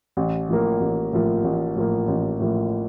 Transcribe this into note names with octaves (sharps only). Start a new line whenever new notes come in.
A1
A2 F3 A#3
A1
A2 F3 A#3
A1
A2 F3 A#3
A1
A2 F3 A#3